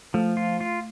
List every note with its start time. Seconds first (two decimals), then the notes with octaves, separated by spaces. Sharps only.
0.14 F3 A3
0.37 F4
0.60 F4